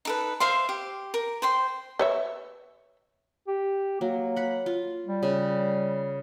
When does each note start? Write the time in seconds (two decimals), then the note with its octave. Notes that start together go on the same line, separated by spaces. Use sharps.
0.05 D#4 A4 B4
0.40 C5 E5 F5 C6
0.69 G4
1.14 A#4
1.42 C5 G5 C6
1.99 B4 C#5 E5
3.48 G4
4.01 F#3 A#3
4.36 F#5 B5
4.66 F4
5.06 G3
5.23 C#3